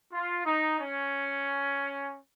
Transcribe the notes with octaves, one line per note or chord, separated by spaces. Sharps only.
F4
D#4
C#4